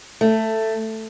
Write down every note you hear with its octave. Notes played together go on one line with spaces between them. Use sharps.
A3